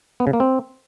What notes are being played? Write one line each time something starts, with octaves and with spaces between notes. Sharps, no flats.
B3
C#3
A#3
C4